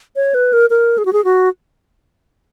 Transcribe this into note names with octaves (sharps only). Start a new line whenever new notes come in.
C#5
B4
A#4
A#4
G#4
F#4
G#4
F#4